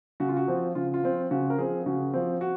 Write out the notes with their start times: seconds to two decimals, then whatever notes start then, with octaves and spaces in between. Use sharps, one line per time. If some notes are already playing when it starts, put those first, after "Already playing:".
0.20 C#3 F#4
0.29 F4
0.37 F#4
0.48 F3 C4
0.75 C#3 F4
0.94 F4
1.03 F3 C4
1.31 C#3 F#4
1.50 A#4
1.58 F3 C4 G#4
1.86 C#3 F#4
2.14 F3 C4
2.41 F#4